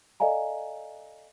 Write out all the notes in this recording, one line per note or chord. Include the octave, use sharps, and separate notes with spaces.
A4 D5 D#5 F5 G#5 A#5